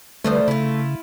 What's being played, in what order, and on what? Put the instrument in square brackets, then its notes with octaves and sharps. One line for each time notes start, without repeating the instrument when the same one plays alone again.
[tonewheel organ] D3 G3 B4 [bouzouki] F3 D4 C5 [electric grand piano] A3
[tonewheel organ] C#3 [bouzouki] E4 F4